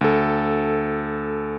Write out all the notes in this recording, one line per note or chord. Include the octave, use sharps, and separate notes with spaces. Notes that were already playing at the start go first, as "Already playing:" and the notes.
D2 A4